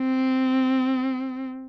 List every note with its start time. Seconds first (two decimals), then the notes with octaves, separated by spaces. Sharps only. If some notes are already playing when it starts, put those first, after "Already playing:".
Already playing: C4